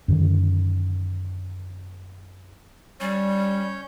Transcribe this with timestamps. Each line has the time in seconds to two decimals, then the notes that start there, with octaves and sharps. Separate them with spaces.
0.08 F#2 D3 D#3
3.00 G3 C#4 C#5 G6